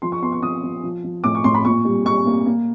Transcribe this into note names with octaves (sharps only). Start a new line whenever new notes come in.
F3 C6
C#6
B3 C6
C#6
F3 D#6
F3
F3
F3
A2 D6
C#6
A2 C6
B5
A#2 C#6
G3
G3 C#6
A#3
A#3